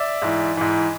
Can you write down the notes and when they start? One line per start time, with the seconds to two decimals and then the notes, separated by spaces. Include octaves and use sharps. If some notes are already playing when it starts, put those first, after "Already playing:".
Already playing: D5 E5
0.22 G#2 E3
0.57 G#2 E3